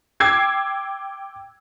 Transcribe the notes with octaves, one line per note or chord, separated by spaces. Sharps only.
G5 D6 E6 G#6 C7